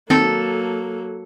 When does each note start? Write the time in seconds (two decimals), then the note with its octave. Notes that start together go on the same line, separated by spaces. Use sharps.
0.10 D#3 F#3 A#3 C4 A4